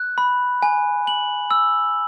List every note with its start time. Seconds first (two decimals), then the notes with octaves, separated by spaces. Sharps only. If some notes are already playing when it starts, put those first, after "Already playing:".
Already playing: F#6
0.18 B5
0.63 G#5
1.07 F#7
1.51 E6